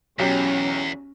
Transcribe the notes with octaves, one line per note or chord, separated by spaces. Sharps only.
B1 E2 F#3 C#4 G4